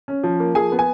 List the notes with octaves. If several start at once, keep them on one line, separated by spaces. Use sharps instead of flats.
C#4
F3
A#3
F3 G#4 G#5
B3
G#5